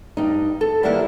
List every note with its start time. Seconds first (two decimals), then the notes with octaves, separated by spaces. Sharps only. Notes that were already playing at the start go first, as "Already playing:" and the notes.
0.17 G2 D#4
0.61 A4
0.83 D#2 G3 A#3 B3 E4 F#5